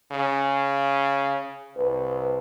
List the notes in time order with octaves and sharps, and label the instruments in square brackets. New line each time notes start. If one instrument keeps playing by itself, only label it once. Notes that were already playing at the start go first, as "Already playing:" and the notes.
[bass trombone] C#3
[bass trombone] C2 [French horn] B4